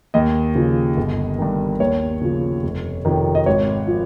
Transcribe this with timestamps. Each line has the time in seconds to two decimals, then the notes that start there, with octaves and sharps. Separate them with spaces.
0.14 D#2 D#5
0.55 C#3 F3
0.97 G1
1.38 G2 D#3
1.80 D#2 C#5
2.21 C#3 F3
2.63 F1
3.05 F2 C3 D#3
3.35 D#5
3.46 G#1 C#5
3.88 F3